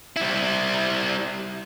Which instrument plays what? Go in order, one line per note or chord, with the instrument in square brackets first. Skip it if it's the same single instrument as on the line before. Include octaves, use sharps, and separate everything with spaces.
[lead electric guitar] G3 E4